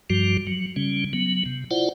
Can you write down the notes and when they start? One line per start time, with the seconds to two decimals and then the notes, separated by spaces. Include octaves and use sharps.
0.10 G2 F3 G3 F#4
0.47 F#3
0.76 C#3 G3 C#4
1.13 F#3 B3
1.46 C3
1.71 E4 F4 C5 D5 F#5